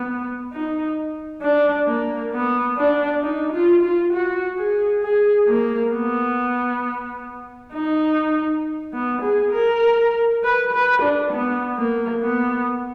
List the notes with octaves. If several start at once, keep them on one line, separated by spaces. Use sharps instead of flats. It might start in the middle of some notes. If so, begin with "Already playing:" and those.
Already playing: B3
D#4
D4
A#3
B3
D4
D#4
F4
F4
F#4
G#4
G#4
A#3
B3
D#4
B3
G#4
A#4
B4
B4
D4
B3
A#3
B3